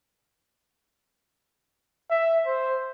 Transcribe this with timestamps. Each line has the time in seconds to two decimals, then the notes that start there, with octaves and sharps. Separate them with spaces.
2.10 E5
2.46 C5